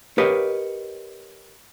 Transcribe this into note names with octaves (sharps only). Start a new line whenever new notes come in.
G4 A#4 B4 C#5 D#5 F5